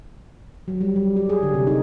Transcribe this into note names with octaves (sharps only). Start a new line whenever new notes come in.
F#3
G3
G3
G4
G#4
D3
C3
D#4